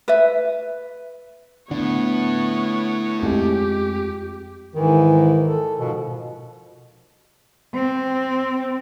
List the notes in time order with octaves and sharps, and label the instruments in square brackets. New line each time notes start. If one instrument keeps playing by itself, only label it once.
[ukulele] B4 E5
[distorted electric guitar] A2 [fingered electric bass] D3 [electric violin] B3 C#5
[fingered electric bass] F2 G#3 [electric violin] G4
[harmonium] G#2 E3 [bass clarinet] D#3
[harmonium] A4
[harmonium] G#2 F3 [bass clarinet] B2
[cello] C4